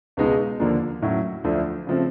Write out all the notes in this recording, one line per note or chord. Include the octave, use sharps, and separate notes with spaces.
C#2 B2 G#3 B3 D#4
D#2 D3 F3 A#3 D4
A2 F#3 A3 C#4 E4
D2 D3 F3 A3 D4
C#3 F3 A3 C4